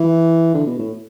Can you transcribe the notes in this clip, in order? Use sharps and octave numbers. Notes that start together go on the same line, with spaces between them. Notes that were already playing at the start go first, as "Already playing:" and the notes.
Already playing: E3
D3
B2
A2